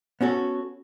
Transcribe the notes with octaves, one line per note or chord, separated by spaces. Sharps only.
B3 C#4 F#4 A4